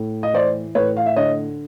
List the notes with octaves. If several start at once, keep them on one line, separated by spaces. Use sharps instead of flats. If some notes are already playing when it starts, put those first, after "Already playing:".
Already playing: A2
D#5
E3 C5 D5
A2 B4 C#5
F5
E5
D3 C#5 D#5